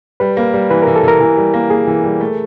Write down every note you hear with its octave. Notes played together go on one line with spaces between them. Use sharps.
G3 B4
A#3
G3
E3 B4
E3 A#4
A4
E3 A#4
E3
G3
A#3
A#3 G#4
E3
G3
A3